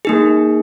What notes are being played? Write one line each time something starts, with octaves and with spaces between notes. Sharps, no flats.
A#3 D#4 G#4